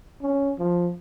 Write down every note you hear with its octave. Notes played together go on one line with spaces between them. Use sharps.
C#4
F3